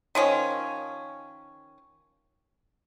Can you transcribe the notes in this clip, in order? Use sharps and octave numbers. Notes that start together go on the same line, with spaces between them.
D#3 F3 C#4